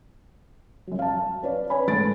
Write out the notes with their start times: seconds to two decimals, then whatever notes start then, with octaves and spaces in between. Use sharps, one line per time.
0.87 F#2 F#3
0.99 F5 A5
1.43 C#4 B4 C#5 D5
1.70 B4 C#5 G#5 B5
1.87 D#1 G#2 A3 A6 D7